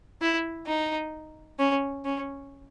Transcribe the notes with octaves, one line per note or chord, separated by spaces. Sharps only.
E4
D#4
C#4
C#4